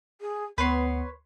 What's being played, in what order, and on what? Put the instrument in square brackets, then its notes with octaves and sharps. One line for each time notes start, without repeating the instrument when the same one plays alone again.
[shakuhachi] G#4
[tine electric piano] D2 [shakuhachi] B3 [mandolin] B4 C#5 C6